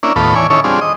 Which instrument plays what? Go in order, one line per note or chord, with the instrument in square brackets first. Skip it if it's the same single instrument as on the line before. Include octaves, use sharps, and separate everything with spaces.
[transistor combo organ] A#3 C#4 D4 E4
D#2 A2 B3 F4 A4 B5
E3 C#5 D5 G#5
D#3 C#4 E4 A4 C#5
G3 C4 D4 F4 G#4
D#5